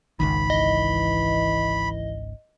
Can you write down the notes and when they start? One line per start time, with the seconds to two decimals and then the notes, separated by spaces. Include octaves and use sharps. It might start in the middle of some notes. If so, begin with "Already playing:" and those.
0.20 G#1 C#2 D#3 B5
0.50 E3 D#5